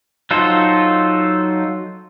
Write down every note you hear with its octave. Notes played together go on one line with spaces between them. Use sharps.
F#3 D#4 F4 A4 C5